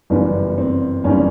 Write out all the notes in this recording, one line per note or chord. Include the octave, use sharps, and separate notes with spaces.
G1 F#2 C#3 E3 G3 B3
C4
G1 F#2 C#3 E3 G3 C#4